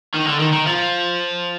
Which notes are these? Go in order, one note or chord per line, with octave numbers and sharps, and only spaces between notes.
D#3
D3
D#3
D#3
F3